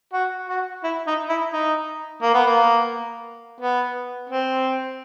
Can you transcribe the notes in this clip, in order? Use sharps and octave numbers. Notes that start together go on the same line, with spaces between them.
F#4
F#4
E4
D#4
E4
D#4
A#3
B3
A#3
B3
C4